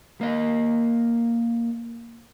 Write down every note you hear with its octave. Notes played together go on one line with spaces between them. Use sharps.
A#3 D#5